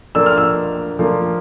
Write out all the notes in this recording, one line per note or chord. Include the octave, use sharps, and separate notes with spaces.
F3 A#3 D4 E6
F6
E6
F3 A#3 D4